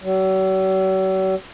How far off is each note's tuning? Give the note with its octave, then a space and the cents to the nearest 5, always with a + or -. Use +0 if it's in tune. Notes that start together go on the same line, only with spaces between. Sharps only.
F#3 +45